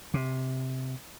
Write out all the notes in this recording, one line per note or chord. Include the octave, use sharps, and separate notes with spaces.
C3